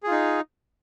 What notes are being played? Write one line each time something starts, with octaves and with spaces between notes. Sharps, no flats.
D#4 F4 G#4